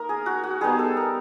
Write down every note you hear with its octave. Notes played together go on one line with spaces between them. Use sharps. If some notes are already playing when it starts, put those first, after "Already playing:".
Already playing: A#3 D#4 A#4
G#4
F#4
F#4
G3 B3 D#4 G#4
A4
A#4